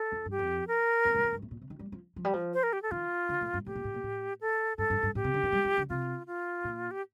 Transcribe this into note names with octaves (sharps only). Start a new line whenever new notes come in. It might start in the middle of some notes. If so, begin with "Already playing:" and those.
Already playing: A4
F2
G2
G4
F2
A#4
F2
G2
F2
G2
A2
A#2
C3
D#3
G3
F3
F3
G3
F3
C5
A#4
G4
A4
D#3 F4
D3
A2
G2
A2 G4
A#2
A2
A#2
A2
A4
G2 A4
G2
G2
A2 G4
C3
D3
D#3
G3
F3
D3
C3 F4
F4
A#2
G4